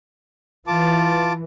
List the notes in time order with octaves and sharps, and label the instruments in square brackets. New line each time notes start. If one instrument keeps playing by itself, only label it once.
[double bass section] E3 [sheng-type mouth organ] F4 A5 D6